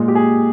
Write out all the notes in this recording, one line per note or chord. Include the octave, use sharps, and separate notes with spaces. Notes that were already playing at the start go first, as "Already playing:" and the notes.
Already playing: A#2 G#3
G4
G#4